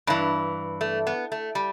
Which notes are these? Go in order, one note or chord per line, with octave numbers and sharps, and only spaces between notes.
G2 E3
A3
B3
A3
G3